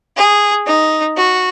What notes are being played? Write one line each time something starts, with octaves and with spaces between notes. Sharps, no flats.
G#4
D#4
F#4